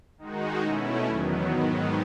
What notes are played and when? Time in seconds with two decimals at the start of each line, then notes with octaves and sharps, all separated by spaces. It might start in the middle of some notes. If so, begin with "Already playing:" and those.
0.18 D#3 G#3 D#4 F#4
0.62 B2 A3 C#4 E4
1.06 E2 D#3 F#3 B3
1.50 G#2 D#3 F#3 B3